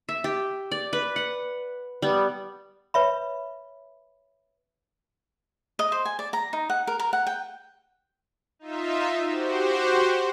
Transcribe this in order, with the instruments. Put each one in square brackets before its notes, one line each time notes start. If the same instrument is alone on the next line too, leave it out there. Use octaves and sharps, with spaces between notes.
[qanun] E5
G4
D5
B4
F#5
G3 B3
[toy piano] B4 C#5 E5 B5
[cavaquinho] D#5
C5
G#5
D5
A#5
D#4
F#5
A#4
A#4
F#5
G5
[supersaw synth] D#4 F4 E5
F#4 G4 C5